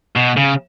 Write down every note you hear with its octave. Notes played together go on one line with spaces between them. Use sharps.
B2
C#3